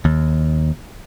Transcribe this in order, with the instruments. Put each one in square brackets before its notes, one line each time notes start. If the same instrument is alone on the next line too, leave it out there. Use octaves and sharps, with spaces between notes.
[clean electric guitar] D#2